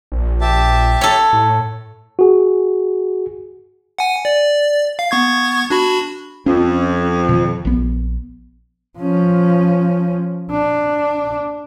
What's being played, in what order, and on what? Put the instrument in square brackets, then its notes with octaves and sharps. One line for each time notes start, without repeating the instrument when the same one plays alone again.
[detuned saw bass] A#1
[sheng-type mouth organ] G4 E5 A5
[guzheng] A4 C#5
[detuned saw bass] A2
[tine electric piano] F#4 G#4
[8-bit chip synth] F#5 G#5
D5
F5
B3 C#6 G#6
D4 F#4 B5
[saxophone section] F2 [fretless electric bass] C#4
[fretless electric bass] B2 D#3 F3
A#1 B3
[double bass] F3 C#4
D4